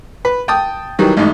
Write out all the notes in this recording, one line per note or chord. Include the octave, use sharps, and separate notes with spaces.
B4
G5 A5 D#6
D#3 E3 F#3 G3
A1 G#2